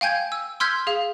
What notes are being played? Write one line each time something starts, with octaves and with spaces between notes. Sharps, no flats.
F5 G5 G#5 G6 G#6
E6
C6 E6 F6 G6 G#6 B6
G#4 F5